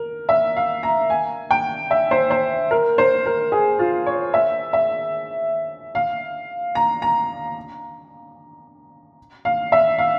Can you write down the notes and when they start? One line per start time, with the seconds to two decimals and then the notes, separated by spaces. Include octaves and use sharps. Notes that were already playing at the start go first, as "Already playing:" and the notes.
Already playing: A#4
0.29 E5
0.56 F5
0.83 A#5
1.10 G#5
1.51 G5
1.91 E5
2.11 C5
2.30 C5
2.71 A#4
2.98 C5
3.26 A#4
3.52 G#4
3.79 F4
4.06 C#5
4.34 E5
4.73 E5
5.95 F5
6.75 A#5
7.02 A#5
9.45 F5
9.72 E5
9.98 F5